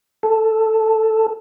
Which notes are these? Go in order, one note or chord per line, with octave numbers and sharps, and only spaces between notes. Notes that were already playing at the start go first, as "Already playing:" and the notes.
A4